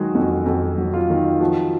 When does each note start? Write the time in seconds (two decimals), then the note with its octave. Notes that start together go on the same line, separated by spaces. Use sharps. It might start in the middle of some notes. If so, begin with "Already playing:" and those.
Already playing: D#3 F#3 G#3 F#4 G#4
0.15 F2 F#4
0.46 F2 F#4
0.78 F#3
0.94 F4
1.10 D#3
1.40 F3 F#4